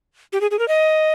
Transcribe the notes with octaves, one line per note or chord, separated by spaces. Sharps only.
G4
G#4
G#4
A#4
D#5